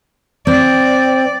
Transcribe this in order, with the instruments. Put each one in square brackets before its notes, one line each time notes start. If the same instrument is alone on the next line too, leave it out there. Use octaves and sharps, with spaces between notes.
[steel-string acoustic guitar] C4 [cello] D5